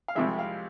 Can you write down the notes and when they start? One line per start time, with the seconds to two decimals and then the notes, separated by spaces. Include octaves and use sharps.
0.08 F5
0.15 C2 C3 F3 G#3 E5
0.39 F5